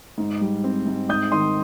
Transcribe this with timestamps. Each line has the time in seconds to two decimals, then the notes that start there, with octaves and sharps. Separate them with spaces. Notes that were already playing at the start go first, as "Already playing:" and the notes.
0.18 G#2
0.41 G3
0.64 C4
0.86 G#2
1.09 G#2 D#6 G6
1.32 D#3 C6 D#6